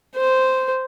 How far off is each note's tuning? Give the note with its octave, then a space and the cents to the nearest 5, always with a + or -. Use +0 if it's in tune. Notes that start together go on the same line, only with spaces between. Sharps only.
C5 -10